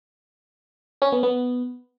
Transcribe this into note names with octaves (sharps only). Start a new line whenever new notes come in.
C#4
B3
B3